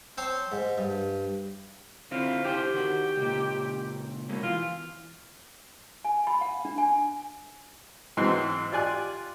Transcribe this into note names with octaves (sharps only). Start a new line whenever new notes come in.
C4 C5 C#5 A5
G#2
G2
D3 C4 E4 F4
E4 G4 G#4 C5
D#3 F#4
C#2 A#2
B2 G#3 A#3
E3 F4
G#5
B5
F#5
D4
G#5
G#2 E3 F#3 C4
F4 G4 D5 G#5 F#6